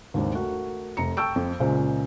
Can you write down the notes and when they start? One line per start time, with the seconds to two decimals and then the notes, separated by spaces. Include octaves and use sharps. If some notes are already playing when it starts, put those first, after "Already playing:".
0.14 D#2 G#2 C4 D4
0.34 A3 F#4 A#4
0.97 F1 A#5 C#7
1.17 G5 A5 C#6 E6 G6 D7
1.36 F2
1.60 C#2 A#2 G#3 F4 C5